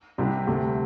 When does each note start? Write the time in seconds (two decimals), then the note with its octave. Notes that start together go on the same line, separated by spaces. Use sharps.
0.18 C2 C3 G3 C4
0.47 D2 C3 A3